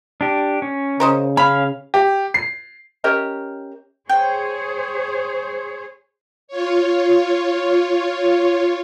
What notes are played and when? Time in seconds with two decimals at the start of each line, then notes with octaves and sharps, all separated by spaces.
0.21 D4 G4
0.62 C#4
1.00 C#3 A#4 C5 D#5
1.37 C#4 F5 B5
1.94 G4
2.34 C7
3.04 C#4 G4 A#4 D#5
4.09 G#4 C5 C#5 G5
6.48 F4 C#5